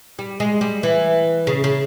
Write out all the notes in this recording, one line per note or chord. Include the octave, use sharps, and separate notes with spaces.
G3
G#3
G3
E3
C#3
C#3